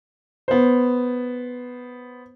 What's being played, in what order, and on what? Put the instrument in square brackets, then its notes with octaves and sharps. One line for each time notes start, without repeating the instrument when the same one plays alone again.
[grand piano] B3 C5